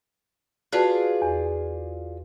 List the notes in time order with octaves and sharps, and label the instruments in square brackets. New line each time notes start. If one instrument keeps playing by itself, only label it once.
[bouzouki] F4 G#4 D5 [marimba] F#4 B4 A5
[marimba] E2